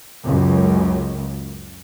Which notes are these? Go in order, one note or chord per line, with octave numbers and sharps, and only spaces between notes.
C#2 F#2